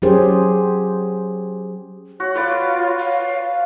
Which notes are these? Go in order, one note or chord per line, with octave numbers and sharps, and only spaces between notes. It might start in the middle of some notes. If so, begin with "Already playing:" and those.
F#3 C#4 G4 G#4 C5
F#4 C#5
F4 B4 D5
F5
F5